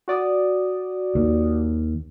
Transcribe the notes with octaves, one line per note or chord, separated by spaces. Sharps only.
F#4 D5 D#6
D#2